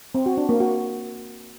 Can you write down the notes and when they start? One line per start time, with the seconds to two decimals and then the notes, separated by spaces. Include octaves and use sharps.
0.15 C4
0.26 F#4
0.37 D4
0.49 A#3
0.60 F#4